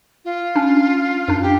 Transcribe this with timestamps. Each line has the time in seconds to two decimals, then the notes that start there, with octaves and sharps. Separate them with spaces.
0.25 F4
0.56 C#4 D4
1.28 F#2 D4
1.42 G4